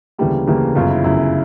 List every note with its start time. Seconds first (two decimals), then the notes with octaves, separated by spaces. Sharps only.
0.18 D2 C#3 E3 G3 A#3
0.47 D2 C#3 E3 G3 A#3
0.75 G1 F#2 C#3 F4
0.91 E4
1.04 G1 F#2 C#3 E4